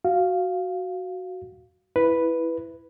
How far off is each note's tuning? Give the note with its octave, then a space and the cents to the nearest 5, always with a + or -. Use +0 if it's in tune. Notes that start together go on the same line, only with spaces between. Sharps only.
F#4 +0 F5 -5
E4 +5 B4 +0